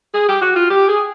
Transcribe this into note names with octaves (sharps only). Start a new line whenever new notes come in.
G#4
G4
F#4
F4
G4
G#4